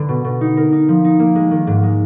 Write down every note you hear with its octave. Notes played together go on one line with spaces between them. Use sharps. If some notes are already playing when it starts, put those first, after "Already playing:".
Already playing: D3 B3
B2
B2
D#4
A#4
D#4
F3
D#4
A#3
G#3
D#3
G#2
G#3